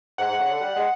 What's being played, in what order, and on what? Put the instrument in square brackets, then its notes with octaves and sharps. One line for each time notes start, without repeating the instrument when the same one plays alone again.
[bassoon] G#2 [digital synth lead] F#5
[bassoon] G#2
C#3
D3
G3
G#3